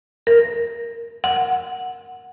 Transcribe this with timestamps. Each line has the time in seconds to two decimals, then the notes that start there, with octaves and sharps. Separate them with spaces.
0.27 A#4
1.24 F#5